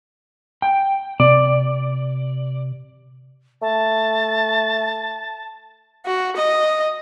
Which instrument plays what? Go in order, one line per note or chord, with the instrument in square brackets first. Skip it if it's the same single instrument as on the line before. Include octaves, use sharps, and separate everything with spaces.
[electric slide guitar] G5
[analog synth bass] C3 [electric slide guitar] D5
[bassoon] A3 [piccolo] A5
[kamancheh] F#4
D#5